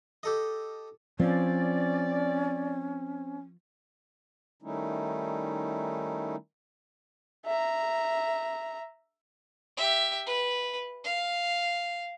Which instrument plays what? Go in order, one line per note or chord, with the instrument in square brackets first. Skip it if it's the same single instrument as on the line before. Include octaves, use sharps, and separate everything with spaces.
[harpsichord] G4 A4 D#5
[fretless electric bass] F3 [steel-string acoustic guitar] C4 [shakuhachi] C#4 [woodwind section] D5
[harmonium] D#3 G3 A3 C#4 D#4 E4
[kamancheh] E5 A#5
[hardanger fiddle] G4 E5
B4
F5